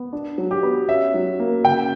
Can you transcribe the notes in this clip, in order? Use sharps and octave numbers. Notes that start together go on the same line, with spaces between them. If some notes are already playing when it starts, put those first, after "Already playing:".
Already playing: B3
D4
F#3
G4
B3
C#4 E5
F#3
A#3
C#3 G5